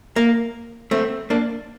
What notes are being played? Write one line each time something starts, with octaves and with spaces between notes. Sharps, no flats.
A#3
A3 C4
A#3 D4